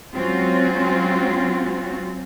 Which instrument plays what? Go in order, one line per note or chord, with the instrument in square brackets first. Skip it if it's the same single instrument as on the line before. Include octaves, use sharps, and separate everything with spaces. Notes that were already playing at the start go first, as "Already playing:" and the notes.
[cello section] F#3 G#3 C4 C#4 F4 F#4